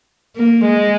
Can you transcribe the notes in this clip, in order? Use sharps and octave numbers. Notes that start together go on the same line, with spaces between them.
A#3
G#3